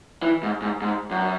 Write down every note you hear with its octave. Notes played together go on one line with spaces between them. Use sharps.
E3
G#2
G#2
G#2
F#2